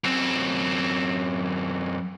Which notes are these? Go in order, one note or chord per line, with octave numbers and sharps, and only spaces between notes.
F#2 C4